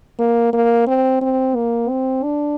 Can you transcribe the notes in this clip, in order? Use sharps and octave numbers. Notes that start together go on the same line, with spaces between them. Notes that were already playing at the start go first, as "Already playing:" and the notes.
A#3
A#3
C4
C4
A#3
C4
D4